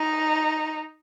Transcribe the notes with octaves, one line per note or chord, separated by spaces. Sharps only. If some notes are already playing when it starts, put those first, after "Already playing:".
Already playing: D#4